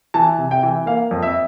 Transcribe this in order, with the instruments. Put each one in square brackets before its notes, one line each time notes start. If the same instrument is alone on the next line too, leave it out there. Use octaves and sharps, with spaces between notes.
[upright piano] E3 A5
C3
G5
E3
A#3 F5
F2
E5